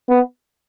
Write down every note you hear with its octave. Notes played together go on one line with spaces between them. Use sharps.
B3